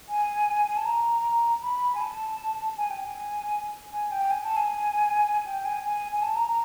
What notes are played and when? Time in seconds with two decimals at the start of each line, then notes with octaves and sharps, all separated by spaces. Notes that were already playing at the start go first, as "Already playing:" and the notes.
0.09 G#5
0.77 A5
0.85 A#5
1.62 B5
1.95 G#5
2.01 A5
2.77 G#5
2.90 G5
3.04 G#5
3.92 G#5
4.11 G5
4.31 G#5
4.44 A5
4.56 G#5
5.46 G5
5.65 G#5
5.84 G#5
6.12 G#5
6.23 A5
6.35 A#5
6.48 A#5